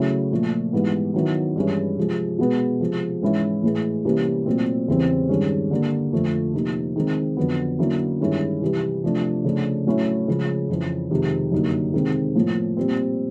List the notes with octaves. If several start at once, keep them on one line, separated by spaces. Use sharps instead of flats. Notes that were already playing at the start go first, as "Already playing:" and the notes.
Already playing: C#3 F#3 A3 C#4 E4
A#2 F3 A3
G#2 E3 G3 B3
D#3 F#3 B3 E4
G2 E3 G#3 C#4 E4
C3 F3 G#3
B2 G#3 B3
C3 F3 G#3
G#2 E3 G#3 C#4 E4
A2 E3 G#3
C3 E3 G3 A#3 C#4
A#2 F#3 A3 C4
E2 C#3 E3 G3 C4
G2 D#3 G#3 C#4
D3 G3 A#3 D4
F2 D3 F3 A3
C3 F3 A#3 D#4
D#3 G#3 C4 D#4
F2 D3 F#3 B3
D3 F#3 A#3 C#4 E4
G2 D#3 G#3 C#4 E4
C3 E3 G3
C3 F3 A3 D4
C#3 F3 A3 D4
A2 F#3 A3 C#4 E4
C#3 F3 G#3
F2 C#3 E3
F2 C3 D#3 G#3
F#2 D3 G3 A#3 D#4
C3 D#3 G#3 C4
A2 F3 A#3
A#2 G3 C4